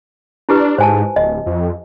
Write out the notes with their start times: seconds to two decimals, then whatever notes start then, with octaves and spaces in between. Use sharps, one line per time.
0.49 D4 E4 G4 B4
0.78 G#2 C5 G#5 A5
1.16 D1 D#5
1.46 F2